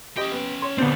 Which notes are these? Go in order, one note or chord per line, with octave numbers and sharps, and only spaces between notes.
C#4 G4 D#5 G5
B3
C#5
G2 D3 B3 C4 D4